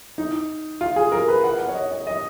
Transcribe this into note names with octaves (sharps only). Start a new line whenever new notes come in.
D#4
F4
G#4
A#4
B4
F#5
F#5
C#5
D#5
D#5
D#5